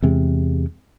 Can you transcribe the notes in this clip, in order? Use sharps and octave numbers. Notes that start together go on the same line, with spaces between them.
E2 C3 G#3